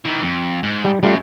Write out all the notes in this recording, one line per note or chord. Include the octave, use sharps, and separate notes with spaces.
D#3 E3
F2
G#2
G3 G5
F#2 G3 A3 F4